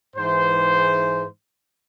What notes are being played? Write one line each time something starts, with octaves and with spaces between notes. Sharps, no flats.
G#2 E3 C5